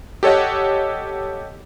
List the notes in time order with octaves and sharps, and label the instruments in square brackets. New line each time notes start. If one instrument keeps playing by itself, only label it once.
[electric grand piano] G4 A4 C#5 D#5 F#5